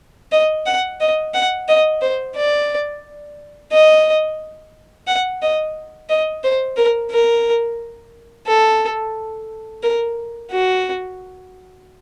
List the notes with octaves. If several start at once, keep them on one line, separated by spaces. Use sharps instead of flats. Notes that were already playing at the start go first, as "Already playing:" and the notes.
D#5
F#5
D#5
F#5
D#5
C5
D5
D#5
F#5
D#5
D#5
C5
A#4
A#4
A4
A#4
F#4